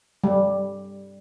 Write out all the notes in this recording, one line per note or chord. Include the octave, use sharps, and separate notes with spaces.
G3